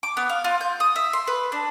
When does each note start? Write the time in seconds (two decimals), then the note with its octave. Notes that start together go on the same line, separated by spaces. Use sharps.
0.03 D6
0.17 B3
0.29 F5
0.44 F4
0.61 G6
0.80 D#6
0.96 E5
1.13 C6
1.27 B4
1.52 D4